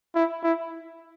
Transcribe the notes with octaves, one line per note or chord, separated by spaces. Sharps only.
E4
E4